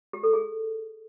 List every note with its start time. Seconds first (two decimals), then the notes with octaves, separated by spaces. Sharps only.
0.13 G4
0.23 A4
0.33 G#4